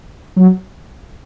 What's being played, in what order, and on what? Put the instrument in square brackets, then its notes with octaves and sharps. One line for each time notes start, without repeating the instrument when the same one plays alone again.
[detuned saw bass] F#3